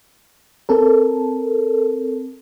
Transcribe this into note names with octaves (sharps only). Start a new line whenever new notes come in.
C4 A4 A#4